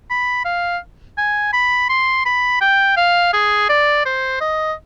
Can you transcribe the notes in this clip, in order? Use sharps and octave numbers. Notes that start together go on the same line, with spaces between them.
B5
F5
G#5
B5
C6
B5
G5
F5
G#4
D5
C5
D#5